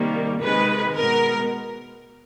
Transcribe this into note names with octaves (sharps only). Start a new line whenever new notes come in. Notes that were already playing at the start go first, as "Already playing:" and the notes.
Already playing: C3 D#3 G3 A#3
C3 D#3 G#3 B4
B2 G#3 B3 A#4